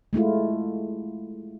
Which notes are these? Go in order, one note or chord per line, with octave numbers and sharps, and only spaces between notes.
G#3 A3 E4 F4